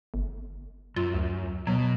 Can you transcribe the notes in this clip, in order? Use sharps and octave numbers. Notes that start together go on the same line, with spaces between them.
G1
F#2 F4
D2
B2 F#3